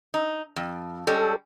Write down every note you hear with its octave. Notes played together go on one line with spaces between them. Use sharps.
D#4
F2
G3 G#3 C#4 A4